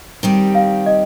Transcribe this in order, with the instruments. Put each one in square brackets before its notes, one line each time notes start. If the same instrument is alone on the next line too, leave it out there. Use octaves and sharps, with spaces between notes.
[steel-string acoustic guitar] D#3 G3 C4 G4
[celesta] F5
D#5